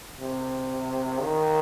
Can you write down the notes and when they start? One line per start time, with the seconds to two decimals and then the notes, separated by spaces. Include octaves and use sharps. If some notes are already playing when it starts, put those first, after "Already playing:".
0.20 C3
1.22 D#3